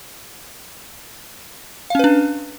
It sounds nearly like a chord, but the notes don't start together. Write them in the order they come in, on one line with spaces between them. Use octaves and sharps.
F5 C#4 B4 D4